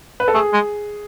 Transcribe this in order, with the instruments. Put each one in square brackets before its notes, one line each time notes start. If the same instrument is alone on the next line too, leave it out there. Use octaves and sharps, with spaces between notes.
[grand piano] B4
A4
[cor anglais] A3 [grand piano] G#4
[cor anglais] G#3